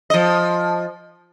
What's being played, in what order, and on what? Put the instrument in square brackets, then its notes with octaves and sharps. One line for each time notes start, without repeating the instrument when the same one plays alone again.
[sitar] F3 D#5